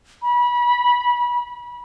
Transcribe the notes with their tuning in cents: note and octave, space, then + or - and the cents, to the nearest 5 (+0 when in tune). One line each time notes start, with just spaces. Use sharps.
B5 -30